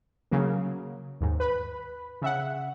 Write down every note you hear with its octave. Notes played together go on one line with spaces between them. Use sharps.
C#3 F#3 A#3
D#2 G#2
B4 B5
C#3 E5 F#5